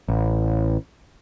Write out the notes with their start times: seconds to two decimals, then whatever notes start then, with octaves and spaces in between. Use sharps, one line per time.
0.08 A1